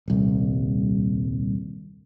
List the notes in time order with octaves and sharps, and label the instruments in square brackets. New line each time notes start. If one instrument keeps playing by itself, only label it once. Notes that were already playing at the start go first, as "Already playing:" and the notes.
[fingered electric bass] D#1 C2